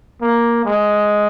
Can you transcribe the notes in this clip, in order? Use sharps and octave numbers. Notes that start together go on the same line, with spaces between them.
A#3
G#3